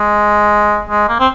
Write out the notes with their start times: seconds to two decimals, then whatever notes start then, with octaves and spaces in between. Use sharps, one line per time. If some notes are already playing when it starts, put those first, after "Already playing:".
Already playing: G#3
0.89 G#3
1.09 A#3
1.20 C4